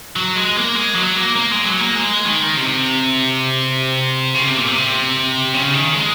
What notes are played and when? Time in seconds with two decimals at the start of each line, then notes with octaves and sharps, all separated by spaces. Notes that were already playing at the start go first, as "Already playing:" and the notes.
0.16 F#3
0.36 G#3
0.57 A#3
0.76 G#3
0.95 F#3
1.16 A#3
1.36 A#3
1.51 G#3
1.66 F#3
1.80 A#3
1.96 G#3
2.25 D#3
2.55 C3
4.35 C#3
4.46 C3
4.58 A#2
4.68 C3
5.54 C#3
5.74 D#3
5.94 G#3